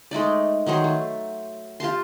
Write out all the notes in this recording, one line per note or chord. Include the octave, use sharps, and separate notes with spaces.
G#3 A3 D#4 D5
D#3 F#3 G#4 C5
A3
F4 G4 A5 C6